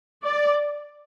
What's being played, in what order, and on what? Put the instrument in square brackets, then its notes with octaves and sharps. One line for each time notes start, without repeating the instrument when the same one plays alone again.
[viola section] D5